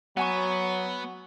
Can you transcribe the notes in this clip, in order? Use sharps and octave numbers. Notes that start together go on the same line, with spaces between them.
F#3 B3 F#5 G#5 C#6